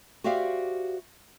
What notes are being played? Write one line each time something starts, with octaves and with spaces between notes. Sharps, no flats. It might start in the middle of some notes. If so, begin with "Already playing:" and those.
F#4 G4 C5 D5 E5 F5